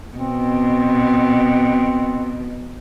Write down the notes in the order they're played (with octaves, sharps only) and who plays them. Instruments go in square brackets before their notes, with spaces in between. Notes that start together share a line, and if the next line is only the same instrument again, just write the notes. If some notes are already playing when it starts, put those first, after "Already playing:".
[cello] B2 [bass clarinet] C4